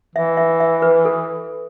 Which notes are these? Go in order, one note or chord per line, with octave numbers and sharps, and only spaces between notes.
E3 E5
E5
E5
B4
A4